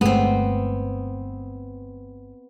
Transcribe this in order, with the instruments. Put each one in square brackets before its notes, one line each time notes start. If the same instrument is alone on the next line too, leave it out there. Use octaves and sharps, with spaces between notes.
[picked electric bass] G1 G#3 A3 [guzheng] B3 C4